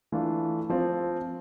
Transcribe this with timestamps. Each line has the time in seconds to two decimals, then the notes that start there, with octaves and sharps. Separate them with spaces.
0.12 E3 A3 D4 F4
0.69 F3 C4 F4